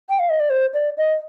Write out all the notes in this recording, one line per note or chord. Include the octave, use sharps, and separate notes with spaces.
G5
F5
D#5
D5
C5
D5
D#5